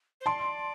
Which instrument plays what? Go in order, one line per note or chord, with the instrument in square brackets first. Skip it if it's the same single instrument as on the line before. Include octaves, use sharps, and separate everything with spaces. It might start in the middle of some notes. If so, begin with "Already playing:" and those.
[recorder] C5
[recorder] D5 [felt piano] A5 C6